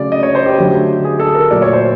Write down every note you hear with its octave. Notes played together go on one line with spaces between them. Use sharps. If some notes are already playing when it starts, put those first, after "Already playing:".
Already playing: C#3 F#3 A3 D5
D#5
C#5
C5
G4
D3 F#3 A3
G#4
A4
A#4
A#2 F#3 A3 D5
C#5
C5